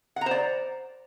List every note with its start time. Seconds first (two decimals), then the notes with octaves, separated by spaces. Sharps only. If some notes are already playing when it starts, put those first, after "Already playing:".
0.16 F#5
0.21 A#5
0.26 C5
0.31 D5